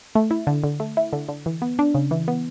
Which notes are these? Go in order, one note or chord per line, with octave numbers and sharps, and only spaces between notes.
A3
E4
D3
D3
A3
E4
D3
D3
E3
B3
D4
C#3
E3
B3